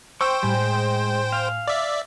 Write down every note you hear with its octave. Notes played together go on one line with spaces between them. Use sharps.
C5 G5 C#6 E6
A2 G3 G#5
G#3
F5
D5 E5